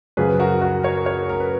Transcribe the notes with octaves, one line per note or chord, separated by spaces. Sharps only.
F#2 C#3 F3 G#4 B4
F#4 A#4
F#4 A#4
A#4 C#5
A#4 C#5
A#4
B4